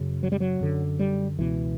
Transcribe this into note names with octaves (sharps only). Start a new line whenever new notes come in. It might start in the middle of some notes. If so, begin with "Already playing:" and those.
Already playing: F#2 C#3
F#3
G3
F#3
F#2 D3
G3
C#2 B2 E3